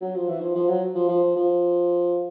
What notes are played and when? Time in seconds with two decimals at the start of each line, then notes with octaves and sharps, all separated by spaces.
0.01 F#3
0.15 F3
0.28 E3
0.41 F3
0.55 F3
0.68 F#3
0.95 F3
1.08 F3
1.36 F3